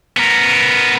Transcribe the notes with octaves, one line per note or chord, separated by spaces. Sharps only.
B3 A#4